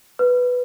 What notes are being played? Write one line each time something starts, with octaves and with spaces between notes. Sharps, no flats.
B4